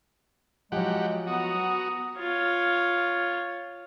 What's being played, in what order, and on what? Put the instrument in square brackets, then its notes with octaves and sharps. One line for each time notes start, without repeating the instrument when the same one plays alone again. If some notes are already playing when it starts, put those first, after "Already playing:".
[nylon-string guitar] F3 F#3 [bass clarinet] G#3 [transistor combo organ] G4 F#5
[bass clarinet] B3 [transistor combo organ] F#4 [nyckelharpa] A#5 D#6
[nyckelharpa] F4 C#5